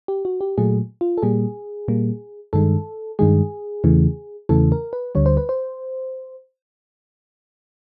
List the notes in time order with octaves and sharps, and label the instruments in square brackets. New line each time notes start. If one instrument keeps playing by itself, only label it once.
[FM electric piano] G4
F#4
G4
A#2 F#3 A3 G#4
F4
A4
A#2 G3 A#3 G#4
A#2 G3 A#3
G2 D#3 G#3 A4
G2 D#3 G#3 G#4
E2 C#3 E3 A3
E2 C#3 E3 A3 A4
A#4
B4
D2 D3 G3 C#5
C5
B4
C5